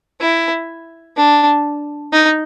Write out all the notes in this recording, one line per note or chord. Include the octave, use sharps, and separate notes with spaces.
E4
D4
D#4